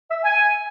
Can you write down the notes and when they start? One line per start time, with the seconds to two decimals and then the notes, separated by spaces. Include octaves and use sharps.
0.10 E5
0.24 G#5